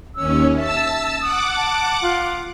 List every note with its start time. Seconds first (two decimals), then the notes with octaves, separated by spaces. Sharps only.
0.16 D#2 C#4 E6
0.56 E5 A5 E6
1.21 F#5 D6 D#6
1.56 A5
2.02 F4